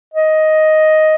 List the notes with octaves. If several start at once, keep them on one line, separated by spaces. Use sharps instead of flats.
D#5